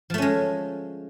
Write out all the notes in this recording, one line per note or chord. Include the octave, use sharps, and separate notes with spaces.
F3 G#3 A3 C#4